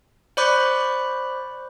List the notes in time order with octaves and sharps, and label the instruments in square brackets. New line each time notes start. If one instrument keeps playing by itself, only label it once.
[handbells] C5 D5 B5 C#6 D6 F#6